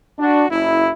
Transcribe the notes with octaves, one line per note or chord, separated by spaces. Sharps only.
D4 F#4
F#1 E4